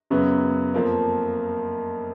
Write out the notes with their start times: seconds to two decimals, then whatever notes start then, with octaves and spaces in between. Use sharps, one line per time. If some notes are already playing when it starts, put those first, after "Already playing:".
0.10 F#2 C#3 F#3 B3
0.74 F2 F3 A#3